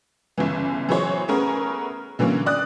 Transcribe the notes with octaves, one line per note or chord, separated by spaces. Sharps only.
G1 C#3 E3
E3 F#3 G#4 C5 C#5
A3 B3 C#4 G#4 A#4
D3 E3 F#3 A#3 C#4
D5 D#6 F#6